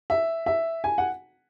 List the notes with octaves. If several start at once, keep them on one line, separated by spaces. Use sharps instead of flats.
E5
E5
G#5
F#5